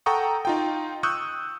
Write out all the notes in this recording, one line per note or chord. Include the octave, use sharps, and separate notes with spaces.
A4 F#5 G5 A#5 C#6 D#6
D#4 F4 G5
C#6 D#6 E6 F#6 G6